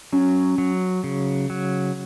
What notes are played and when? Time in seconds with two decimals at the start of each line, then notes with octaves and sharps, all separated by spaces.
0.13 F#3 C#4
0.58 F#3
1.04 C#3
1.50 F#3